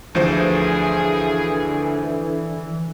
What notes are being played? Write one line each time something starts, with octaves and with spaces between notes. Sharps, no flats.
D2 D3 E3 F3 G#4 C5